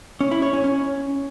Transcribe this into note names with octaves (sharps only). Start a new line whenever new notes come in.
C#4
E4
C#5
C#4
C#4